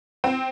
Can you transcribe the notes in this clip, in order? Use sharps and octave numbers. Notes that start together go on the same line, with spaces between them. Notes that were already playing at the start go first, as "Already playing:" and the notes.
C4